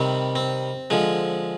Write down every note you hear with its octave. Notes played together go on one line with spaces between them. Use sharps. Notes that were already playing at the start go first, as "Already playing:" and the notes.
Already playing: C3 D#3 G3 C4
C4
D3 F3 G#3